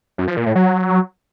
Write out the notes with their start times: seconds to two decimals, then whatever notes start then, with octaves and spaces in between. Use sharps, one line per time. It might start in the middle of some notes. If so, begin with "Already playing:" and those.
0.18 F#2
0.28 F3
0.37 A#2
0.46 A2
0.55 F#3